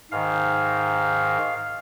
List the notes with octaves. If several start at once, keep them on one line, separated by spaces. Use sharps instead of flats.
G#2 D#3 F5